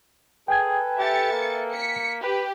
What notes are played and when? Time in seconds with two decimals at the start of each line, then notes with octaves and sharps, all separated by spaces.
0.48 G#4 A4 B4 G5 G#5 G#6
0.99 G4 E5 A6 C#7
1.32 A#3
1.73 B6 C#7
2.23 G4 B4